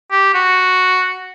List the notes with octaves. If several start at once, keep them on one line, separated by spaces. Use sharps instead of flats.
G4
F#4